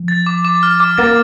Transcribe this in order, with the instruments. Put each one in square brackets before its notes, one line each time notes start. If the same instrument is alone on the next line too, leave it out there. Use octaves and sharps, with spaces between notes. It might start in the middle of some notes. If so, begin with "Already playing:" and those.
Already playing: [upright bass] F3
[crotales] A6
D6
D6
F6
D6
[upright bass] A#3 [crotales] A6